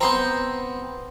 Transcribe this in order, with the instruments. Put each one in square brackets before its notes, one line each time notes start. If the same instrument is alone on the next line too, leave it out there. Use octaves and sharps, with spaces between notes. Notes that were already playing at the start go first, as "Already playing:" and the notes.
[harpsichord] B3 C4 [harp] A#5 C6 G6